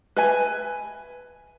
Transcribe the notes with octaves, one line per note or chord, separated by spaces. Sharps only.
B4 E5 G#5